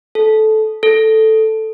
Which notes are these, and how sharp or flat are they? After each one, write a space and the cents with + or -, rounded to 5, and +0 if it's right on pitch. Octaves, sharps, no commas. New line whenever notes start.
A4 -15
A4 +0